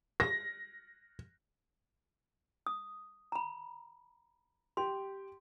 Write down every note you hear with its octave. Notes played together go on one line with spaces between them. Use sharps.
A#6
D#6
A#5 B5
G4 C6